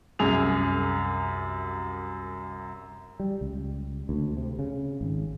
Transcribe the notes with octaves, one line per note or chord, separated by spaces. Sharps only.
C2 F#2 G#4 F7
G3
C#2
D2
C3
C#3
G#1